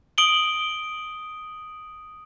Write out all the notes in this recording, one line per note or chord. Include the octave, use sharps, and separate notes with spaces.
D#6 D7 F#7 G7